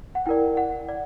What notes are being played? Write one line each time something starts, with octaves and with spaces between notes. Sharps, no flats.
F#5
E4 A#4 D5 G5
F#5
D5